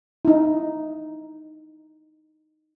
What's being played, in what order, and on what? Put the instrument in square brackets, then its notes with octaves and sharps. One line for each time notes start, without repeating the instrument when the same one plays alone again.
[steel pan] D#4 E4